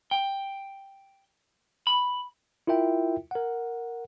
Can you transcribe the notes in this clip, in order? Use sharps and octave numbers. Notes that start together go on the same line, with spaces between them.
G5
B5
E4 F4 A#4 E5 G5
A#4 F#5